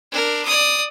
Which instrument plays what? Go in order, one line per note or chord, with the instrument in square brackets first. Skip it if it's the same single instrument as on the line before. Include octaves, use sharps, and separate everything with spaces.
[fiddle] D4 A#4
D5 D#6